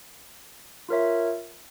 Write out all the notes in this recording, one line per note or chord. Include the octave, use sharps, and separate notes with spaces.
F4 A#4 C#5 E5